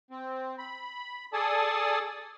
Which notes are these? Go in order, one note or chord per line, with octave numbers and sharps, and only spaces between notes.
C4
B5
G#4 A4 D5 G#5 A5 D#6